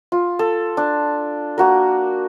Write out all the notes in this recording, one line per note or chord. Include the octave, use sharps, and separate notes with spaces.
F4
A4
D4
A#3 F#4 A#4